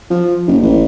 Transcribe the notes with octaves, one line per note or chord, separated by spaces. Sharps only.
F3
F#1
A1